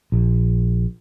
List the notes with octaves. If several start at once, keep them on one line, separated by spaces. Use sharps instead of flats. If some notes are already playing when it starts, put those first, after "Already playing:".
A#1